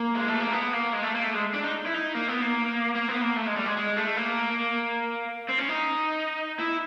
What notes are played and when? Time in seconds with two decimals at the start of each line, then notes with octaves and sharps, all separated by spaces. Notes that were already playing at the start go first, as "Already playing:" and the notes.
Already playing: A#3
0.15 G#3
0.28 A3
0.40 A#3
0.53 B3
0.73 A#3
0.93 G#3
1.03 A3
1.15 A#3
1.24 A3
1.34 G#3
1.54 D4
1.64 D#4
1.86 E4
1.94 D#4
2.15 A#3
2.28 B3
2.42 A#3
2.95 A#3
3.08 B3
3.21 A#3
3.36 A3
3.46 G#3
3.56 G3
3.66 G#3
3.77 G#3
3.97 A3
4.17 A#3
5.48 C4
5.58 C#4
5.69 D#4
6.59 E4